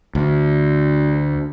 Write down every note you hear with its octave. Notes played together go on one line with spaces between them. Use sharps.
D2